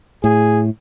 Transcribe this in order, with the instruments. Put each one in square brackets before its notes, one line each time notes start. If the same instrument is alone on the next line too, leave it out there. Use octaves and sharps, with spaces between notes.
[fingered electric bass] A2 [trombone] G#4